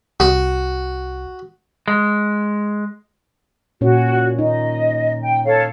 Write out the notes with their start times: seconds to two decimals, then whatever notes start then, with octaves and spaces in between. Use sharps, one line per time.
0.20 C2 F#4
1.88 G#3
3.81 A#2 C#4 F#4 C#5
4.39 D#4 D#5
5.22 G5
5.45 A4 C#5 F5